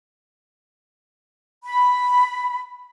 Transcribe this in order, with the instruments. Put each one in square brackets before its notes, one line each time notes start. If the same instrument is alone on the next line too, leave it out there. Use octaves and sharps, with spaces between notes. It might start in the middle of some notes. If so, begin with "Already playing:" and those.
[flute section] B5